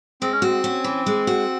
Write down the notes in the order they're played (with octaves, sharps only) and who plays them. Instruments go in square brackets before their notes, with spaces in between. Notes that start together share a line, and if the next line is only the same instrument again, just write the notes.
[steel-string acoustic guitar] G#3 [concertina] C4
[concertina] C#4
[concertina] C4 [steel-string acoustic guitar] F#4
[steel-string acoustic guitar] C#4
E3
G#3
F#4